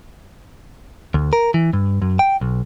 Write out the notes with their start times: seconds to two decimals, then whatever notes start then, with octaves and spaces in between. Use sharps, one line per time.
1.14 D2
1.33 A#4
1.54 E3
1.73 G2
2.02 F#2
2.19 G5
2.41 B1